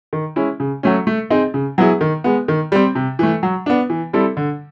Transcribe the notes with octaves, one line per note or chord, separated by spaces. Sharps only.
D#3
G#3 C#4 E4
C#3
F#3 A3 C#4
A3
C4 D#4 G#4
C#3
F#3 B3 E4 G#4
D#3
G#3 B3
D#3
G3 C4
C3
E3 A3
F#3
B3 D4
E3
G3 C4 E4 A4
D3